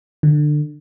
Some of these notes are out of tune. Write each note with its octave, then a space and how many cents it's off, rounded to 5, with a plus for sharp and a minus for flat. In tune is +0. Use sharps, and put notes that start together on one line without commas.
D3 +25